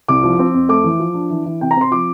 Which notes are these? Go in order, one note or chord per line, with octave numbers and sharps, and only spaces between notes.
C2 D6
F3
C4
F2
A3 D6
E3
F3
D4
E3
E3
C3 G5
A#5
C4 C6
F3 D6